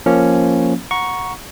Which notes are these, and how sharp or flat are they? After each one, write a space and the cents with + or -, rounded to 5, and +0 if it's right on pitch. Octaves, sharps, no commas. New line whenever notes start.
F3 +0 A#3 +0 C#4 +0
F#5 -15 A#5 +20 C#6 +0